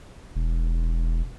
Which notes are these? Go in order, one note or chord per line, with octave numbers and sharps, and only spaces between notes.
E1